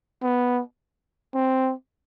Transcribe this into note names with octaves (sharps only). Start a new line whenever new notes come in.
B3
C4